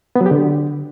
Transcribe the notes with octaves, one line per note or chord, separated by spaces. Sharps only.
B3
F#3
G4
D3